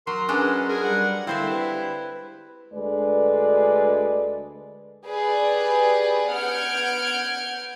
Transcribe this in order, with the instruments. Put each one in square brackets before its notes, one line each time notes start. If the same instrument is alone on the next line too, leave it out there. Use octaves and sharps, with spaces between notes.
[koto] F#3 [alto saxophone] A#4 [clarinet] C6
[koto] F#3 G#3 D4 [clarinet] C#4 [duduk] B4
[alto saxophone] G#4 [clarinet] A#4
[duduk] G3 [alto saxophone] F#5
[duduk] D3 [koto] C4 C5 E5 [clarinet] E4 [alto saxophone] F5
[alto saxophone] G3 [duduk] B4
[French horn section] D2 D3 G#3 A4 B4 D5
[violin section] G4 G#4 B4 D5
B3 F#5 F6 G6 G#6 D7